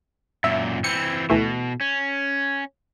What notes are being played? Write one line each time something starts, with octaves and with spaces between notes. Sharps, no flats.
F#2 A#2 E5
E3 C4 C#7
D2 B2 E3 A3
C#4